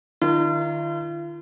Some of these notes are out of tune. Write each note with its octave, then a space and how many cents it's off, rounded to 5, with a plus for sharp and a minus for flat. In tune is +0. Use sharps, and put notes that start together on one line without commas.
D#3 -40 F4 -45 A#4 +0